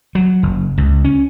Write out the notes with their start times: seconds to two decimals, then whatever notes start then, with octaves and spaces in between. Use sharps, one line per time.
0.15 F#3
0.43 F#1
0.78 C#2
1.05 C#4